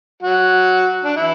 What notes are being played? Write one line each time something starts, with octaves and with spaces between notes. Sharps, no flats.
F#3 F#4
D4
E3 E4